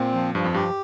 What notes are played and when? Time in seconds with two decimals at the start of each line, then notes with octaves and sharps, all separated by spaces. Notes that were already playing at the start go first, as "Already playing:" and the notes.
Already playing: A#2 C4
0.14 F3
0.35 G2 F3
0.44 F2
0.54 G2 G4